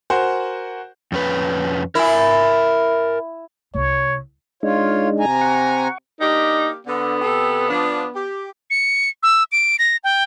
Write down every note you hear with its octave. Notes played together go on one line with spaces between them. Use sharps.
F#4 A#4 C5 F#5 G#5
F2 C#4 B4
E4 A#4 G#5
C2 C#5
G#3 D4 D#4 F4 C#5
C3 G#5 A#5
F#5 C#6
A#3 D4 D#4 G4
D3 B3
C3 G4 A4
F3 D4
G4
C#7
E6
D7
A#6
G5